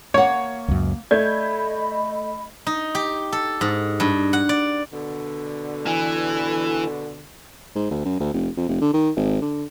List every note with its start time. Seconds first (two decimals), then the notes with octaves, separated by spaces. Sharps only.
0.14 A#3 C#5 F#5
0.68 C#2 F#2
1.11 A3 D5 D#5 B5 G6 G#6
2.67 D#4
2.95 G4
3.32 A4
3.61 G#2
4.00 G2
4.33 F#5
4.49 D5
4.92 B2 D3
5.87 E3
7.75 G#2
7.91 D2
8.05 F#2
8.20 D2
8.33 F1
8.57 F2
8.68 F1
8.81 D3
8.94 D#3
9.16 G#1
9.42 D3